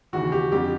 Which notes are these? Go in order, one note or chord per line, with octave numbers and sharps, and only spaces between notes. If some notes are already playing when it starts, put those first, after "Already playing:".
D#2 C#3 E3 F#4
G4
F2 D3 G4